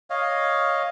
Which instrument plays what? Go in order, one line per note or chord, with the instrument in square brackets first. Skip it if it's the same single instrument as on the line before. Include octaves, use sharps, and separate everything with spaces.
[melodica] C#5 D#5 F5